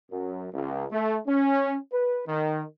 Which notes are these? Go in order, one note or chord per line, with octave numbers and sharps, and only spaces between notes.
F#2
C#2
A3
C#4
B4
D#3